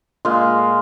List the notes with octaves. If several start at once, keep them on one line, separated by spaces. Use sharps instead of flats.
A#2 G#3 F4